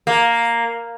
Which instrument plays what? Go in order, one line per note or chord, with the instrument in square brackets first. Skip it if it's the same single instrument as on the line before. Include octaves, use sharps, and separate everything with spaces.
[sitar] A#3